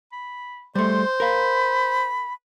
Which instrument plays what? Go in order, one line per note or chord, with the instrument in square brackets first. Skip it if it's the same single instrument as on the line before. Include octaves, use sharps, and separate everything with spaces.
[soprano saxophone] B5
[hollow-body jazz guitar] G3 A3 [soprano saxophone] C5 [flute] C6
[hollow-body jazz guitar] A#4 F5 [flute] B5